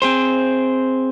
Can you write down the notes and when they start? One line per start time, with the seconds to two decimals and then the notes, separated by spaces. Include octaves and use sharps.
0.02 C4 G#4 C5